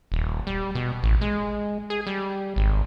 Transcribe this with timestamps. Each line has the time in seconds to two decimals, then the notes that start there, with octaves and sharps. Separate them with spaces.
0.12 D#1
0.47 G3
0.75 B2
1.03 A1
1.21 G#3
1.90 G#4
2.07 G3
2.56 G#1